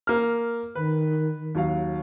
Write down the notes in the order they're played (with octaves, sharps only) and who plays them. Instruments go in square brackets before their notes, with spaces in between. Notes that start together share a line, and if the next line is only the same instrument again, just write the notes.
[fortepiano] A#3 F6
[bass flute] D#3 [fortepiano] B4
[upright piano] D#2 F#3 F5